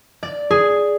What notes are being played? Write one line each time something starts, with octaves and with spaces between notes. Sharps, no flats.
D5
G#4